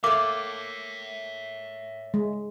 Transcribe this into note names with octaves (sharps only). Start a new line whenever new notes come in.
A3 A#3 C#5 E5 D6
G#3